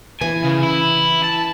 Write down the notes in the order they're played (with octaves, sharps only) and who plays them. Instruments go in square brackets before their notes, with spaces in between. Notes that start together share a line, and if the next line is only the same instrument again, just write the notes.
[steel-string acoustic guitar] E3 [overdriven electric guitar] G#5
[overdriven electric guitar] C#3
E4
A5